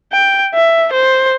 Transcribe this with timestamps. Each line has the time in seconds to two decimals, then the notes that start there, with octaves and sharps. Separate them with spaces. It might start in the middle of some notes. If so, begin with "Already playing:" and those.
0.13 G5
0.54 E5
0.93 C5